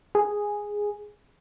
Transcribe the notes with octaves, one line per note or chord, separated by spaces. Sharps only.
G#4